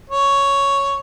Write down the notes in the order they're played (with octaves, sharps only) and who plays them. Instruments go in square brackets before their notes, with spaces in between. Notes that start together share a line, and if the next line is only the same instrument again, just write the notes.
[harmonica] C#5